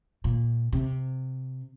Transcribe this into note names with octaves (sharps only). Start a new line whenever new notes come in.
A#2
C3